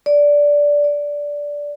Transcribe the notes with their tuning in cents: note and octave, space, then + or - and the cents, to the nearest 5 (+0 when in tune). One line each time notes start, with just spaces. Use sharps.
D5 -10
D5 -10